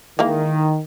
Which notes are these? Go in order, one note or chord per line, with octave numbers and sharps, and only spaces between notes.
D#3 E3 G#3 A#3